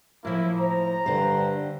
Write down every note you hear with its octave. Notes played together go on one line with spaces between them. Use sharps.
A2 F3 A#3 E4
C5 A#5
G2 D3 C5